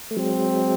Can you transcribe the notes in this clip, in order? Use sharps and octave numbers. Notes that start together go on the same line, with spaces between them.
A3
F#3 G#3 C4